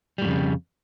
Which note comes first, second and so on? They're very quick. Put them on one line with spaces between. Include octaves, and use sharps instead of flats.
G3 A2 F2 C#3